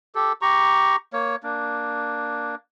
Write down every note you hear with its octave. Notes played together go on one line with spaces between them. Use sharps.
G4 A4
G4 A#5 C#6
A#3 C#5
A#3 D4